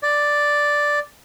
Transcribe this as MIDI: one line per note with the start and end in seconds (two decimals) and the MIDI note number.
0.03 0.99 74